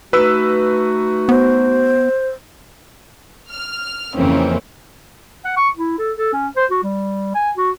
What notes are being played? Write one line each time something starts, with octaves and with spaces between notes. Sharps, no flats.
A3 D#4 F#4 B4 E6
B3 C5
F6
F2 C#3 E3 A#3 C4 C#4
F#5
C#6
E4
A4
A4
C#4
C5
F#4
G3
G#5
F#4